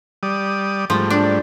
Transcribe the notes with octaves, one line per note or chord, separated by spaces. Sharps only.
G3 D5 D#6
G#2 F3 G3 A3
D4